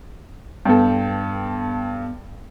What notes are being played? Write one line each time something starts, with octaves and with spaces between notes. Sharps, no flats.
G2 B3 A4 G5